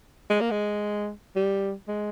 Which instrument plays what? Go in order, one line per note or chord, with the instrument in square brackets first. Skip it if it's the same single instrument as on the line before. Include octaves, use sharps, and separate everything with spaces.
[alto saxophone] G#3
A#3
G#3
G3
G#3